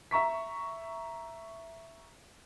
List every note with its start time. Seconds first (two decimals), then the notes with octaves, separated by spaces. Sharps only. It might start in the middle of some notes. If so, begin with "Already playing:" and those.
0.11 E5 A#5 C#6 B6